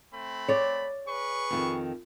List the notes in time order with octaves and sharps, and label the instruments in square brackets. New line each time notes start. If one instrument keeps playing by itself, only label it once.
[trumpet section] A3 C4 B5
[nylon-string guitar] C#5 D5
[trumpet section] G#4 B4 C#6
[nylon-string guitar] F2 D#3